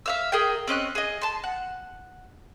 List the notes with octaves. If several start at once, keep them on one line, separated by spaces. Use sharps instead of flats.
E5 F5 E6
G#4 A#4 G5
C4 C#4 D#5 F#6
G#4 D#5
A5 C6
F#5